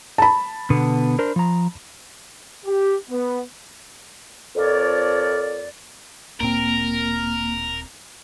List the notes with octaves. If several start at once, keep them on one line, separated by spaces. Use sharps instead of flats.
A5 B5
B2 D3 B3
D4 A#4 C5
F3 A#5
G4
B3
F2 A#4 C#5 D5
D1 A#2 A#3 C4 A#4